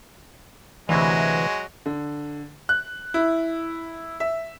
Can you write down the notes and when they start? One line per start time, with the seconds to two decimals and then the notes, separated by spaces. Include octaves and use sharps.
0.89 D2 C3 E3 F#3 G#3
1.86 D3
2.69 F#6
3.14 E4
4.20 E5